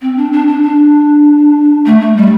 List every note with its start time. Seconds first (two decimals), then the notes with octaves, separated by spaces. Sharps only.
0.01 C4
0.17 D4
0.32 D4
0.48 D4
0.63 D4
1.86 A3
2.01 A3
2.16 G3